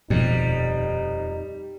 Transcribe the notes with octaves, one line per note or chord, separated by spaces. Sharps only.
D#1 F2 B2 F3 G3 D#4